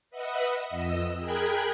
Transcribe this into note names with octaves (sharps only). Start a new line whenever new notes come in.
B4 D#5 E5 F#5
F2 D#5 E6
G#4 A#4 G5 B5 F#6 G#6